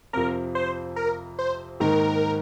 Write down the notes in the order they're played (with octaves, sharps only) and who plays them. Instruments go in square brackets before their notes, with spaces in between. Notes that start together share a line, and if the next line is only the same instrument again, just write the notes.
[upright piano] F2 C3 F3 [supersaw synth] A#4
[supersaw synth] C5
A#4
C5
[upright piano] G#2 D#3 A#3 D#4 [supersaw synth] A#4